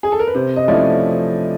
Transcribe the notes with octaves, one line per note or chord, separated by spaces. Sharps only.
G#4
A4
A#4
B4
C3 C5
D#5
F3 A3 C#4 E4 D5